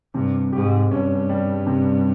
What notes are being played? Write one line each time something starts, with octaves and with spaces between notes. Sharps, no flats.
G2 C3
G#2 G4
G2 C#4
G3
C3